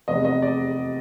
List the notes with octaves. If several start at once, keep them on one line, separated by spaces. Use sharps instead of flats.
F1 E2 C3 D#5
D#5
D5